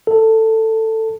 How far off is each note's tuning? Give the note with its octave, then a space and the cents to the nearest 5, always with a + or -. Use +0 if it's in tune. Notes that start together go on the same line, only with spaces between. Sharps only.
A4 +15